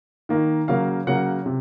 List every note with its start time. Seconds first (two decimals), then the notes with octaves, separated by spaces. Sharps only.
0.29 D#3 A#3
0.68 C#3 F#3 A#3 F5
1.07 C#3 F#3 A#3 F#5
1.46 C3